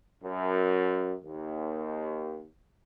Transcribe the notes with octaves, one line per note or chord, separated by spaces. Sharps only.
F#2
D#2